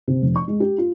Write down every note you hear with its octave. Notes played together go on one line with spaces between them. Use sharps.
C3
F1
C#6
G#3
G4
F4